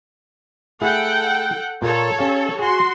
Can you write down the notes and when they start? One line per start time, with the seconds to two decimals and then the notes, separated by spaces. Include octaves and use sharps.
0.81 A3 E4 G#4 A4 F#5 G5
1.82 A#2 A#3 A4 C#5
2.19 C#4 G4 F5
2.59 F#4 G#4 G#5 C6